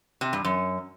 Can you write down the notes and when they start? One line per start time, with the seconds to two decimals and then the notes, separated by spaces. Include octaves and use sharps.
0.21 C3
0.33 G2
0.44 F#2